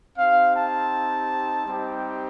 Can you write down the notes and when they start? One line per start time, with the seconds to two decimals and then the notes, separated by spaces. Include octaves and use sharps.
0.17 C4 D#4 G4 F5
0.55 A5
1.66 G3 C4 D#4 G4